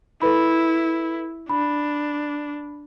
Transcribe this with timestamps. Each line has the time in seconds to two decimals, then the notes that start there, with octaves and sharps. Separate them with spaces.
0.22 E4 A4 B4 B5
1.49 D4 B5